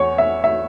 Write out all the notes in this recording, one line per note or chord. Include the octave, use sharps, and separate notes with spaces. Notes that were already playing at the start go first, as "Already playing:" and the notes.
Already playing: E2 C#5
E5
E5